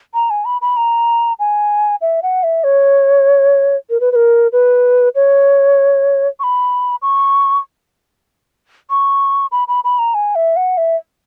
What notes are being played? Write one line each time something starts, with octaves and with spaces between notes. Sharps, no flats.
A#5
G#5
B5
B5
A#5
G#5
E5
F#5
E5
C#5
A#4
B4
B4
A#4
B4
C#5
C#6
B5
C#6
C#6
B5
B5
B5
A#5
G#5
E5
F#5
E5